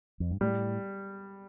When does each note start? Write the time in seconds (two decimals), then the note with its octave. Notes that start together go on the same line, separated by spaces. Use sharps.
0.20 F2
0.31 G2
0.41 A2 G3